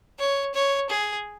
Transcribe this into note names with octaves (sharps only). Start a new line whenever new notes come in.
C#5
C#5
G#4